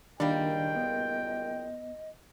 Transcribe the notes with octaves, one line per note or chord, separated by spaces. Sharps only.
F#1 A#2 D#3 G3 A#3 D4 D#5 G5
B3